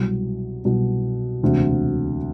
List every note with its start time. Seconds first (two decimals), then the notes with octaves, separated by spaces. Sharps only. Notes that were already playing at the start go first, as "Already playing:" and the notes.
Already playing: C2 B2 F#3
0.65 C2 B2 F#3
1.42 E1 D2 C3